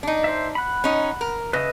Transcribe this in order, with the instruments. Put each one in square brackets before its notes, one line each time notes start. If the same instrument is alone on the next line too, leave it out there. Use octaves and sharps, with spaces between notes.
[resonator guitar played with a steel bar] D4 D#4
[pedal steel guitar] C5 E5
F#5 B5
[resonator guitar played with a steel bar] C#4 D#4
A#4
[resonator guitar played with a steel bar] C#3 [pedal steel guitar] B4 D#5 E5